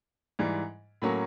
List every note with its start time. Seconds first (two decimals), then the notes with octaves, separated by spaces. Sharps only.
0.39 G#2 E3 G3
1.02 A2 F#3 A#3 C#4